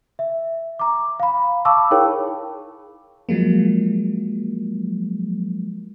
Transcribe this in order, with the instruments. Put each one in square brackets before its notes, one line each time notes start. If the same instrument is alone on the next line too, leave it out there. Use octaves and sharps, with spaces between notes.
[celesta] E5
A#5 D6
F5 B5
F5 A5 B5 C#6 D6 E6
D#4 E4 G#4 A#4 C#5 G5
[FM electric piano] F3 F#3 G#3 A#3